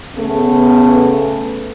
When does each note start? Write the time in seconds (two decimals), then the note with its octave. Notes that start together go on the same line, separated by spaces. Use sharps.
0.16 C#3 A3 B3